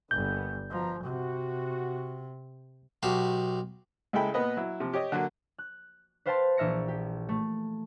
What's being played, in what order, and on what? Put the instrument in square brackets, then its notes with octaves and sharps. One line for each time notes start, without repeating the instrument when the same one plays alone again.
[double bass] G1 [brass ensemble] D3 A#3 B3 [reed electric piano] G6
[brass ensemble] B2 A#5 [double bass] F3
[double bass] C3 [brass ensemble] F#4
[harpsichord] B1 F#4 G4 F5 A5 B5
[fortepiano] C#2 G#3 E4 A4 G5 B5
A#2 B3 B4 D#5
F#3 E4
C3 F3
G4 C#5 D#5
D3 F#3 A#3
[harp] F#6
B4 C5 F5 G5 A5 C6
A#1 E3 E5 F6 A#6 C#7
G4
A3